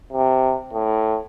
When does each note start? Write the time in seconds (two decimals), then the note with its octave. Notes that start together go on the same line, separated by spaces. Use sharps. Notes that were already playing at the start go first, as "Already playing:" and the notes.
0.12 C3
0.73 A2